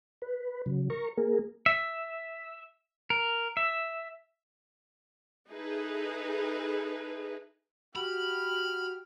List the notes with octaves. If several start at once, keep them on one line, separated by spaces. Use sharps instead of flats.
B4
C#3 F#3
A#4 A#5 C#6
A#3 G#4 A#4
E5
A#4
E5
D#4 E4 G#4 A4 B4
F#4 G4 B5 F6